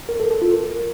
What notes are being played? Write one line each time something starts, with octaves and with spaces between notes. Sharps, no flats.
A#4
A4
A4
F4
A#4